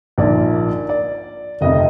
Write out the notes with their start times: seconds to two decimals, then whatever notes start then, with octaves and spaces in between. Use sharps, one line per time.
0.18 A#1 G#2 F3 A#3 D5
0.89 D5
1.61 F1 F2 C3 D#5